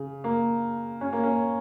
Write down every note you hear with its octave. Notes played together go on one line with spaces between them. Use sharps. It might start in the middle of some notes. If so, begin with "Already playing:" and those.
Already playing: C#3
A#3
C#4
A#3
C#4